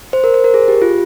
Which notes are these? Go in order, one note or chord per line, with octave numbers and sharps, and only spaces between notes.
C5
A#4
C5
A#4
G#4
G4
F4